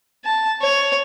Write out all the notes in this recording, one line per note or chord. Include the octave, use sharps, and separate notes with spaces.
A5
C#5